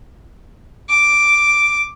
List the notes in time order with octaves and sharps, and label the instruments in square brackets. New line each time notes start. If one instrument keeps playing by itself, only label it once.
[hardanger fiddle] D6